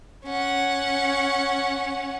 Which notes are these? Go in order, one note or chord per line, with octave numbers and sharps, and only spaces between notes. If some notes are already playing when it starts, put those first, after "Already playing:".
C#4 F#5